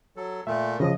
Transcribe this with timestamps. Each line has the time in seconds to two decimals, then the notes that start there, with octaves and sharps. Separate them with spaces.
0.16 F#3 A4
0.47 A#2 A3 E5
0.80 C#3 F3 D#5 D#6